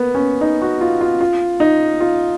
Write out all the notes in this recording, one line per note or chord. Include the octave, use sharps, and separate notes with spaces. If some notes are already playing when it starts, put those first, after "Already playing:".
Already playing: A#3 B3
C#4
D#4
F#4
F4
F4
F4
D#4
F4